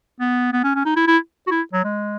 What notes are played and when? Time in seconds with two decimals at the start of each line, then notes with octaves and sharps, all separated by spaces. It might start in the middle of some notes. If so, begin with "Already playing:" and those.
0.20 B3
0.53 B3
0.64 C#4
0.75 C#4
0.85 D#4
0.96 E4
1.07 E4
1.47 F#4
1.51 E4
1.73 F#3
1.84 G#3